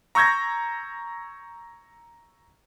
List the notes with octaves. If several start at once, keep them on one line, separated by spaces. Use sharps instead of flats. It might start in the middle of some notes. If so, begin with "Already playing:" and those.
A#5 C#6 E6 G6 G#6 A#6